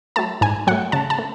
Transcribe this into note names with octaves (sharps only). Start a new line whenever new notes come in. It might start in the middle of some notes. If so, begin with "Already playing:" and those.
F#3 A3 A5
G#2 G#5
F#3 A3 F#5
C#3 A5
A5
A3